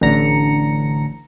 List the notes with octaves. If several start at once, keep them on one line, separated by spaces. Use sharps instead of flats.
A1 D3 A#5 C#7